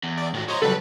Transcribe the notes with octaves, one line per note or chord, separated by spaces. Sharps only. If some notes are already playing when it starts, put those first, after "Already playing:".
E2
D5
A2 D#3 F#4
F#3 C5 C#5 D#5 A#5
C#3 F#3 G3 A4 B4 B5